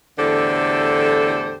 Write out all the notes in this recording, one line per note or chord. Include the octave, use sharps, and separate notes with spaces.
E2 A2 D3 G4 A4 C5